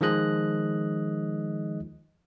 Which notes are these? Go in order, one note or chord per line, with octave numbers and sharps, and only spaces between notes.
D#3 F3 G#3 D#5 F#6